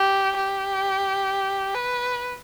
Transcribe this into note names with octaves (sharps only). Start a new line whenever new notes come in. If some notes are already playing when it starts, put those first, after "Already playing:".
Already playing: G4
G4
B4